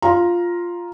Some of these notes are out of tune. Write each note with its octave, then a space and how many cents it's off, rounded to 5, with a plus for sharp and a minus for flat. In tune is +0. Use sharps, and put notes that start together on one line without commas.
F4 +0 A#5 +10